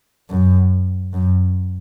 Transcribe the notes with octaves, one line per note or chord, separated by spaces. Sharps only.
F#2
F#2